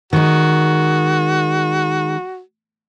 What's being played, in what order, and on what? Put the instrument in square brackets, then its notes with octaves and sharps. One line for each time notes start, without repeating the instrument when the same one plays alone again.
[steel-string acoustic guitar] D#3 G#3 [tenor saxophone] F#4